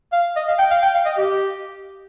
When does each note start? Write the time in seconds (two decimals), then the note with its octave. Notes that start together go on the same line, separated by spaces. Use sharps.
0.12 F5
0.36 D#5
0.48 F5
0.59 G5
0.70 F5
0.82 G5
0.95 F5
1.06 D#5
1.18 G4